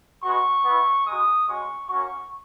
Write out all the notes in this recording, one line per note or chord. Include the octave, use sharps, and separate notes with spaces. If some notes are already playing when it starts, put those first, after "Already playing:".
G#3 B3 F#4 C#6
B3 E4
G#3 D#4 F#4 D#6
G#3 C#4 F#4 C#6
A#3 C#4 F#4 C#6